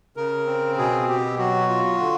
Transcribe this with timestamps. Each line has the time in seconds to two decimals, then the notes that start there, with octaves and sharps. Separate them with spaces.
0.16 C#3 A#4
0.47 C4
0.78 B2 G#4
1.08 B2 G4
1.38 F#3 F#4
1.69 F4
2.00 D3